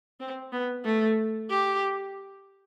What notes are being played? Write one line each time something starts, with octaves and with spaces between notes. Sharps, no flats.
C4
B3
A3
G4